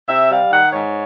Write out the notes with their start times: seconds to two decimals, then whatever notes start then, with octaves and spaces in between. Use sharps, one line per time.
0.08 C3 E5
0.30 G3 F5
0.51 D#3 F#5
0.72 G#2 C#5